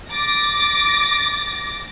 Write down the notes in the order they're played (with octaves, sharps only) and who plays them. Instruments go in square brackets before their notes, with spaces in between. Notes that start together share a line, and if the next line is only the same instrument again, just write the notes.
[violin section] D6 A6 A#6